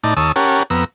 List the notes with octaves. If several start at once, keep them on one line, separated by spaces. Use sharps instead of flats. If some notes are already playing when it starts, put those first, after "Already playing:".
A2 D#4 D5 A5
D#2 C#5 A5 D#6 E6
C#4 G4 A#4 C#5 F#5 A5
F2 B3 A#5 E6